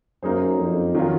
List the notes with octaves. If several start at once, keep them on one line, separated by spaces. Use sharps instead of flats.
F#2 A#3 D#4 G#4 C5
F2
D#3 F#3 C#4 F4